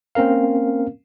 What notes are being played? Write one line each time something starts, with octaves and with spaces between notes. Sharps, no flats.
A#3 C4 C#4 A#4 F5